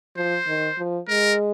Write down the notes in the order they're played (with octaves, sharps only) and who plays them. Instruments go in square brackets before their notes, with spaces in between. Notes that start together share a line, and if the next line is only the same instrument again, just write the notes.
[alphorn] F3 [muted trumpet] C5
[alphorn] D#3
F3
[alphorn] G#3 [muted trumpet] A#4